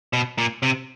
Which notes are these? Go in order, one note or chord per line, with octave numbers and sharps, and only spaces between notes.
B2
A#2
C3